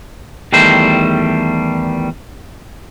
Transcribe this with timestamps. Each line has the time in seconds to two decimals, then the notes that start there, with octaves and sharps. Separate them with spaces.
0.53 E2 D#3 G3 A3 C5